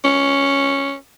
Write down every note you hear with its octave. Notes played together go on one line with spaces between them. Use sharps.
C#4